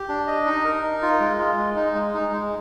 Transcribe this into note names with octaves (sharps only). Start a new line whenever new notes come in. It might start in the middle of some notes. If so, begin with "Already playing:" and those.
Already playing: G4
D4
D#5
D#4
A#4
D#4
F4
G#3
F4
G#3
D#4
G#3
D#4
G#3